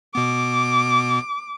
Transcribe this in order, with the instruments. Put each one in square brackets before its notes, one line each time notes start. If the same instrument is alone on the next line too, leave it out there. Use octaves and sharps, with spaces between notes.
[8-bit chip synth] B2 B3 [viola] D6